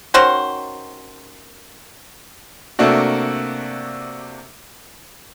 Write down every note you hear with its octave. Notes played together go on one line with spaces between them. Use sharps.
D#3 C#4 F#4 C5
C3 A3 A#3 D4 F#4